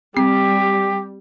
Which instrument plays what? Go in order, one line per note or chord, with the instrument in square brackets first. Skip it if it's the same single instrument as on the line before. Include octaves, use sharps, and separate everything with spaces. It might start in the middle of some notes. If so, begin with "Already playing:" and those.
[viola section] G3 [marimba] C4 [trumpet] G4